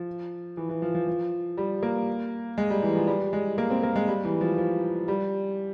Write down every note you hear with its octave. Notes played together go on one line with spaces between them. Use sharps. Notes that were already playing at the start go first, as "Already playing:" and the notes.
Already playing: F3
E3
E3
F3
F3
F3
G3
A#3
G#3
G3
E3
F3
G3
G#3
A#3
C4
A#3
G#3
G3
E3
F3
F3
G3